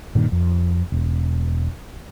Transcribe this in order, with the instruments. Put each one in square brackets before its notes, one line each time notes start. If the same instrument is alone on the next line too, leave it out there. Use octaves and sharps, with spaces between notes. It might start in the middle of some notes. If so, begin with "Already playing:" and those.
[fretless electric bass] G2 A#2 D#3
F2
E1